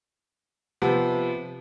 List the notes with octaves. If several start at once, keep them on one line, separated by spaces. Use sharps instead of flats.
C3 F3 B3